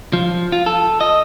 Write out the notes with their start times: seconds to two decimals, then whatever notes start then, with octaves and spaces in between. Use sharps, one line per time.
0.13 F3
0.52 F4
0.66 A4
1.01 D#5